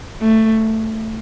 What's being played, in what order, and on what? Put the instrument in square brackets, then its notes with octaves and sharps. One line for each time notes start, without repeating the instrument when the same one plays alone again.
[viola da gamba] A3